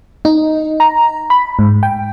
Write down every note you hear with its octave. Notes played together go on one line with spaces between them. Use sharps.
D#4
A#5
B5
G#2
G5